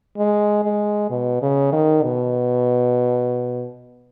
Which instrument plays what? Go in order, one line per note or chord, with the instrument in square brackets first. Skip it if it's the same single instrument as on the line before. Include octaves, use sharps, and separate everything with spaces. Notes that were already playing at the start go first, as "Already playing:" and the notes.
[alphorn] G#3
G#3
B2
C#3
D#3
B2